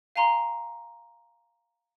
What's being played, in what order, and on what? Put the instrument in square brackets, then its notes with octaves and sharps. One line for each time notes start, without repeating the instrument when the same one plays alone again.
[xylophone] F5 G#5 A#5 C6